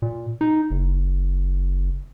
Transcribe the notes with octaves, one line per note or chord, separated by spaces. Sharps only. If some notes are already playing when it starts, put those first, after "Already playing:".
A#2
D#4
F#1